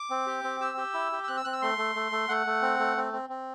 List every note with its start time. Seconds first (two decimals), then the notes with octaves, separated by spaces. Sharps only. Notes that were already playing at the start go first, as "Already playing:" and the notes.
Already playing: D6
0.10 C4
0.27 G4
0.44 C4
0.61 G4 E6
0.77 G4
0.94 E4
1.12 G4
1.24 E6
1.28 C4 F#6
1.37 E6
1.45 C4 F#6
1.53 E6
1.62 A3 C6
1.78 A3
1.96 A3
2.12 A3
2.29 A3 F#5
2.47 A3
2.62 C4
2.79 A3
2.97 C4
3.13 C4
3.29 C4